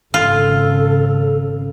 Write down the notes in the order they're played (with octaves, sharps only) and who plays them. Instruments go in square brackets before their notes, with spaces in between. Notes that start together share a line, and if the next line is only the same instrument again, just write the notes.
[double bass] G#1 C#3 [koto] F4 [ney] A4